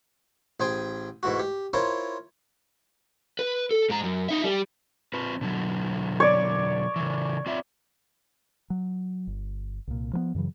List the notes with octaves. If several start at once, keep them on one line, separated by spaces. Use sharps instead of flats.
A1 G#4 C5 G5 G#5 C6
G#2 E3 A3 F#4
G4
E4 F4 A#4 C5 C#5
B4
A4
G#2 A#5
F#2
D#4 E5
G3
C4 F4 B4
B2 D3 F#3
C#5 D5
C#3 E3
C4 F4 E5
F#3
G1
C2 A#2
F3 F#3 B3
F#2 C#3 E3 F#3